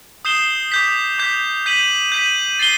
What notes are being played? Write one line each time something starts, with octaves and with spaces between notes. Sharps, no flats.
D#6 G6 C7 E7 G7
D6 G6 B6
D6 G6 B6
G6 B6 D#7 F#7
G6 B6 D#7 F#7
A6 C7 D#7 G7